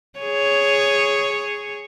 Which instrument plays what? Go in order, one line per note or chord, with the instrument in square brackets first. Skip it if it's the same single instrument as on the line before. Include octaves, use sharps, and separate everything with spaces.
[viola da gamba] G#4 C#5